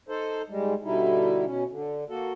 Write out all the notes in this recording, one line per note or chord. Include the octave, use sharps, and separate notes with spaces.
D#4 A4 C5
G#2 G3 G#3
B2 D3 G3 D#4 E4
B2 C#4
D3
A#3 F#4 A4